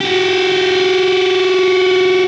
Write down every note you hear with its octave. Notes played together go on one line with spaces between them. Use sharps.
F#4 G4